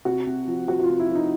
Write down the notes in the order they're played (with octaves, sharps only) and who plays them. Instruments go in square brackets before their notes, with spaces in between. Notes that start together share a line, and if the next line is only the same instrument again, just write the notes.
[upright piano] C3 F#4
C3
F3
F3 F#4
F#4
F4
C3
E4
F3
D#4